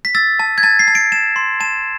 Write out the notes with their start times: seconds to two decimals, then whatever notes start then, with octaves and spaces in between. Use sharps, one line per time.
0.05 B6
0.15 E6 A6
0.40 A5
0.58 G#6
0.63 A5 A6
0.79 C7
0.88 A5
0.95 D7
1.12 A5 E7
1.36 C6
1.60 A5 E7